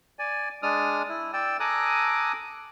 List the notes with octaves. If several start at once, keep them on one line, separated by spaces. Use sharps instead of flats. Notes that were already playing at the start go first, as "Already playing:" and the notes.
D5 G#5
G#3 D4 D#6 F6
E4
D5 G5 E6
A4 G#5 A#5 D6 D#6 F#6